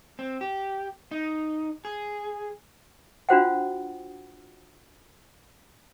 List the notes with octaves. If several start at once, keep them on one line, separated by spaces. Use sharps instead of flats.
C4
G4
D#4
G#4
D4 F4 F#4 C5 F#5 G5